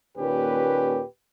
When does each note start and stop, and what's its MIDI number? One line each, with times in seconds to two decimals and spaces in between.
0.17 1.00 39
0.17 1.00 46
0.17 1.00 61
0.17 1.05 67
0.17 1.06 71